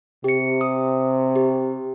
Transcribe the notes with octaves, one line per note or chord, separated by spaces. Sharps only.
C3 G4 C#7
D#6
G4